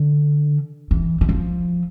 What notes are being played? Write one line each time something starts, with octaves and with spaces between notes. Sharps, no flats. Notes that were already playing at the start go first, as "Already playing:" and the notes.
Already playing: D3
E3
E3
F3